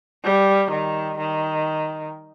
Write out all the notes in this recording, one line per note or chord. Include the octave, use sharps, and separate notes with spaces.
G3
D#3
D#3